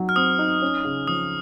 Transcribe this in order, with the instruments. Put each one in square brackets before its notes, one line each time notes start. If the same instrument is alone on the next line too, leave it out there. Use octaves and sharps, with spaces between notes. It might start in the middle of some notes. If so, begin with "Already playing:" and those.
Already playing: [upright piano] F#3 D#4 F#4
[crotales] F6
[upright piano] C4 [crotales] D#6
[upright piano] D#4
C#4
C#3
[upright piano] F3 [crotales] D#6